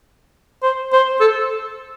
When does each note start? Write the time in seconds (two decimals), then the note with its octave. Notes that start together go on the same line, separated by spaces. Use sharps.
0.63 C5
0.93 C5
1.21 A4